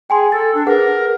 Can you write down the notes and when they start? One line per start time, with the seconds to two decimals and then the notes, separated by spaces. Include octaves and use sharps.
0.10 G#4 G5 G#5 C6
0.32 A4 A6
0.54 D4
0.67 G#4 A#4 B4 F#5